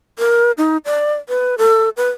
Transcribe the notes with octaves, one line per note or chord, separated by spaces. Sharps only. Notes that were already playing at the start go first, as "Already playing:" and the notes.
A#4
D#4
D5
B4
A4
B4